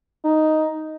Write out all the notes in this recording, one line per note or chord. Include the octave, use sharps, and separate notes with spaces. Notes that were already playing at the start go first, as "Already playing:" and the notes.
D#4